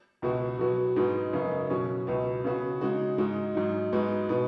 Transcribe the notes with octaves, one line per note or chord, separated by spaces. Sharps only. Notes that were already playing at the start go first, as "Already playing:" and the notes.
C#2 B2 B3 F#4
B2 F#3 B3 F#4
G#2 G#3 B3 D#4 F#4
F#2 C#3 F#3 B3 D#4
B2 F#3 C#4 F#4
C#2 B2 B3
C#3 B3 F#4
C#3 G#3 D#4 F#4
G#2 G#3 D#4 F#4
G#2 F#3 D#4
G#2 G#3 B3 D#4 F#4
B2 B3 D#4 F#4